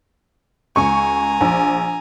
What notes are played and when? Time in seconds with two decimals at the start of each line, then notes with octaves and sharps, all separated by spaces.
0.76 C#2 G#5 A#5 C#6
1.41 A#1